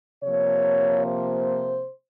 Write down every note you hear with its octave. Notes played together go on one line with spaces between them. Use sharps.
C3 F3 A#3 C#5
C5